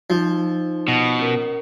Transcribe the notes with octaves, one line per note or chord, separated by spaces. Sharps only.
F3 D#4
B2
C#4 A#4